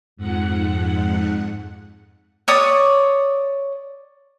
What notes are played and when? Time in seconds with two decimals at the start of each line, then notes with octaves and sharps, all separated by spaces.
0.17 F2 G#2 F#5
2.48 C#5 D5 D#6